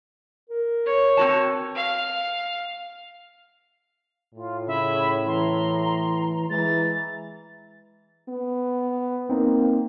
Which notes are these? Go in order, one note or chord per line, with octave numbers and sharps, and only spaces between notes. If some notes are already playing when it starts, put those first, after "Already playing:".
A#4
C#5
C4 F#4 A5
F5
A2 F4
C#3 C#5 E5 B5
E3 A#5 C6
E3 G#3 A6
B3
A#3 C4 D#4